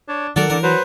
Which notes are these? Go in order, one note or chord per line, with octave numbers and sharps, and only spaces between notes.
D4 C#5
D#3 F#3 A4 A#4 D5 F#5
D3 E3 A#4
F#3 B4 C5